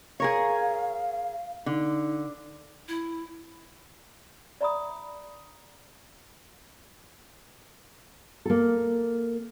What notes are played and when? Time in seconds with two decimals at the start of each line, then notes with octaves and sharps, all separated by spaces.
0.20 G#4 A#4 C#5 F5
1.66 D3 D#4
2.88 E4
4.61 D5 E5 A#5 B5 C#6 D#6
8.46 A#3 A4